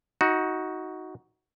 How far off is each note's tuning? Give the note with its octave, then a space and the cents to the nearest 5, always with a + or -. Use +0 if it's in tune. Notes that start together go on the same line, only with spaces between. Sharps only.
D#4 +20 F#4 +0